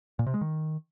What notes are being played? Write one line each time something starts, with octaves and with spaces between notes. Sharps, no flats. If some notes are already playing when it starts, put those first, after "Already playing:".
A#2
C3
G#3
D#3